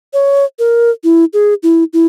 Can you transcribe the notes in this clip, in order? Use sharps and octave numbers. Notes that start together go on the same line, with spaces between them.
C#5
A#4
E4
G#4
E4
E4